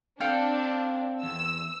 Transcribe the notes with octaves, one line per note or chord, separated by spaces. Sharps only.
C4 D4 A4 F5 G5
E2 E6